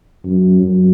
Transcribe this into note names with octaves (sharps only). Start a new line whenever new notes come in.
F#2
F#2